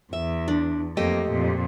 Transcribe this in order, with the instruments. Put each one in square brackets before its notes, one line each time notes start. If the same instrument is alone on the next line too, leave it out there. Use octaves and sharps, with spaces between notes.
[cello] E2 [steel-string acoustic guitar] E5
[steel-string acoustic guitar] D4
[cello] F2 A#3 [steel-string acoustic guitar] A3 G4 D#5
[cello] F2 A#2